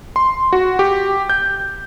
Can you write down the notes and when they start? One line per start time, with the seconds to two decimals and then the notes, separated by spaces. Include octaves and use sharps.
0.16 C6
0.53 F#4
0.79 G4
1.30 G6